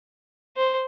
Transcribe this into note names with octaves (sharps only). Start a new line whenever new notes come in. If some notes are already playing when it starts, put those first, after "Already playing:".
C5